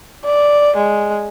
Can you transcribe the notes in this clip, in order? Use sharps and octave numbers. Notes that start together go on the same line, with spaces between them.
D5
G#3